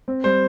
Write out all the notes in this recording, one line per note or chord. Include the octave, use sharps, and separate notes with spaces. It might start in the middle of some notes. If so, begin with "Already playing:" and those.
C4
G3 C5